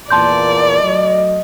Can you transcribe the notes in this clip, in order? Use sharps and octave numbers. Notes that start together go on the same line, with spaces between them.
E2 A#2 D5 A5 C6 G6
F#3 A3 D#5